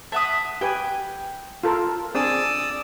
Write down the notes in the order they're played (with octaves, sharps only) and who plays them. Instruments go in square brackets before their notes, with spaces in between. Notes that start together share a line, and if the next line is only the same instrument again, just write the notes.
[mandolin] E5 F#5 D#6 [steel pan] A5
[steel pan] G4 B4 G#5 [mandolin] G5
[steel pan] F4 A4 A#4
[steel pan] C4 D4 G#4 [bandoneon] D5 D#6 E6